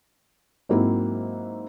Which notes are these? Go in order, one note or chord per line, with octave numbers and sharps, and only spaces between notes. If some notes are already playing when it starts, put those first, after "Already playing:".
G#2 F#3 A#3 C4 E4